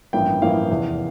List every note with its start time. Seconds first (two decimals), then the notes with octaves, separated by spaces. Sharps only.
0.13 A1 G2 F3 A#3 E4 G5
0.42 A1 G2 F3 A#3 E4 F5
0.69 F1 E2 E3